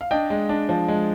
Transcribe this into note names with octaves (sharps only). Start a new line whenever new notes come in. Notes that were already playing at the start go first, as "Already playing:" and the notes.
F5
D4 D#5 G5
G#3
D4
F3
G#3